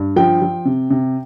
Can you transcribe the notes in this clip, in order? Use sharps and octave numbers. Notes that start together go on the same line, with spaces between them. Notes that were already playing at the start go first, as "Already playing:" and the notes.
Already playing: G2
F3 G5
F3
C3
C3